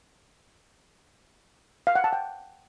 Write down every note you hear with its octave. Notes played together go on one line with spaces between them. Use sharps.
F5
F#5
A5
G5